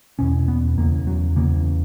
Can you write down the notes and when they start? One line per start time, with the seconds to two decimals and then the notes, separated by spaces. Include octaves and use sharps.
0.19 E2 B2 C#4
0.48 B3
0.78 E2 C#3 A#3
1.07 F#3
1.36 E2 C#3 A#3